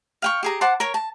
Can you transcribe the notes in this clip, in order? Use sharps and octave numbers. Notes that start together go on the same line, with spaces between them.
F5 G5 C#6
G4 G#4 A#5
C5 F#5 A5 D6
A#4 C#5
A5